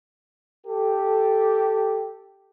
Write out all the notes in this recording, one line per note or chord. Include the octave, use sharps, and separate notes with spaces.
G4 A4